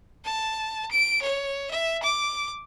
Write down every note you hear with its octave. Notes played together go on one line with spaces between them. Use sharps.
A5
D7
C#5
E5
D6